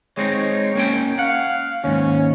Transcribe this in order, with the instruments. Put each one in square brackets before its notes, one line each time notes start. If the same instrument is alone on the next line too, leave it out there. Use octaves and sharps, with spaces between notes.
[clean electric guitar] G#3 C4 D#4 [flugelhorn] C#5
[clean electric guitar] A#3 C#4 G5
[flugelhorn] F5 [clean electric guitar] F#5
[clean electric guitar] D#2 G#2 [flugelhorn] C#4